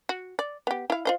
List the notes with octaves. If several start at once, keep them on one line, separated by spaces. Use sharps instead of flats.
F#4
D5
B3 G4
E4 F5
F4 C5 D#5